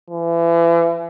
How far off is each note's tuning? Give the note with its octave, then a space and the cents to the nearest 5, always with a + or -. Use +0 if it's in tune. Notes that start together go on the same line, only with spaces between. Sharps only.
E3 +35